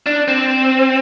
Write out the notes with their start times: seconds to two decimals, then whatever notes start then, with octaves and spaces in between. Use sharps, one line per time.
0.06 D4
0.28 C4